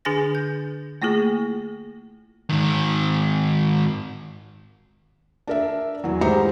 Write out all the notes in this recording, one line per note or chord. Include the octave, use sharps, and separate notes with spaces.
D3 D4 G#4 G#5 A6 A#6
G6
A3 A#3 E4 F4 G#4
G#2 D#3
D4 A#4 E5
E2 E3 F#3
G#2 G#3 G4 C5 A#5 C#7